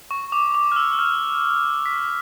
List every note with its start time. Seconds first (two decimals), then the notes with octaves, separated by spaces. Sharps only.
0.11 C#6
0.32 D6
0.55 D6
0.72 F6
0.76 E6
0.99 F6
1.86 B6